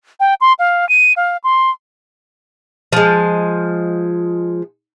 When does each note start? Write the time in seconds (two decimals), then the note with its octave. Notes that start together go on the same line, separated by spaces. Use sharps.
0.20 G5
0.41 C6
0.59 F5
0.89 D#7
1.16 F5
1.44 C6
2.93 F3 G#3